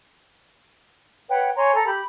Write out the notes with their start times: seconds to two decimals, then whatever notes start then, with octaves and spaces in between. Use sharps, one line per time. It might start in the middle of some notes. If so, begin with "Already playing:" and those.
1.29 B4 C#5 F#5 G5
1.56 C#5 G#5 A#5 C6
1.74 A4 A#5
1.87 G4 B5